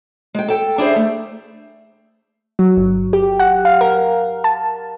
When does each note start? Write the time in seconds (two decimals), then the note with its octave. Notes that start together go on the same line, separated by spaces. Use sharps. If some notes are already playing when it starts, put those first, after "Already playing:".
0.34 G#3 G5
0.48 A4 G5
0.78 D4 E4 G#4 C5
0.96 A3
2.59 F#3
2.77 G1
3.13 G4
3.39 F#5
3.65 F5
3.81 A#4
4.44 A5